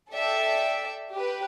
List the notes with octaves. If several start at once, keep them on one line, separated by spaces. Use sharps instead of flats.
A4 D5 E5 G5
G4 B4